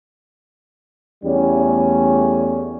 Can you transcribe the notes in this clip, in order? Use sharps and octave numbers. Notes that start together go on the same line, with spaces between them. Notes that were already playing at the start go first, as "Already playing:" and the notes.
E2 G3 A3 C#4